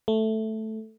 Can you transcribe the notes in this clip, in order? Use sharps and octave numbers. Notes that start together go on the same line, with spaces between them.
A3